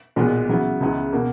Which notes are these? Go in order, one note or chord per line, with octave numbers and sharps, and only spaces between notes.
B1 A#2 G#3 B3
C#3 F#3 B3 E4
C#2 C#3 G#3 B3 E4
B2 A#3